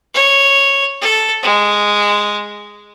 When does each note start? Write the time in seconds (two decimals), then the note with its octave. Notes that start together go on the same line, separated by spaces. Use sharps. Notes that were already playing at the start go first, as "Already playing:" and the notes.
0.14 C#5
1.01 A4
1.43 G#3